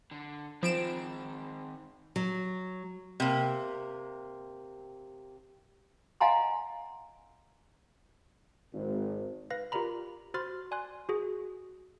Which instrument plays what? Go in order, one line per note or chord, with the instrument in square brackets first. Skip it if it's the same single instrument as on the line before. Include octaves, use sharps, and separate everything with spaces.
[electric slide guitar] D3
[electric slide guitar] D#3 C4 [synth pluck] F3 D7 E7
[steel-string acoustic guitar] F#3
[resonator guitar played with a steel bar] C3 A#3
[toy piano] D#5 F5 F#5 G#5 A#5 C6
[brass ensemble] G#1
[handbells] B4 F5 A#6
F4 G4 A#4 D5 A#5 B5
F#4 C5 B5 C6 F6 A6
D5 G#5 C6 F#6
F#4 G#4